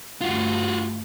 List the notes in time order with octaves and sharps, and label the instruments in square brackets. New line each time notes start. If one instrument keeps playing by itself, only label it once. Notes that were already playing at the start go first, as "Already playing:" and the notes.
[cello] D2 G2 [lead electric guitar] F4 F#4